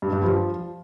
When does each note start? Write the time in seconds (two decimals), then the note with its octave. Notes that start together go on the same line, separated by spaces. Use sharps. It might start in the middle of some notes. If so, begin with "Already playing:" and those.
0.02 G2
0.13 G2
0.23 F3